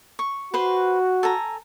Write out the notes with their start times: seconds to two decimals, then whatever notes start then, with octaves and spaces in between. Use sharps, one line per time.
0.19 C#6
0.54 F#4 B4 C5 C6
1.23 A4 G#5 A#5